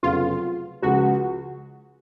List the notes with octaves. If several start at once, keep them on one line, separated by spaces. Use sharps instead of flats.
F1 F2 C#3 F#3 B3 F4
C#2 C#3 F3 G#3 F#4